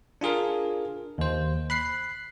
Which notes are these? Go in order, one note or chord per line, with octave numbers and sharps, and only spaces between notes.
D4 F4 G#4 A#4
D#2 C5
B5 F#6 C7